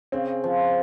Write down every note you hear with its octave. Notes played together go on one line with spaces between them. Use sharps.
C#3 C4
F3